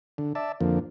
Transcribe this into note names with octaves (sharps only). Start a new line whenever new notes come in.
D3
D5 E5 A5
F2 D3 F3 A#3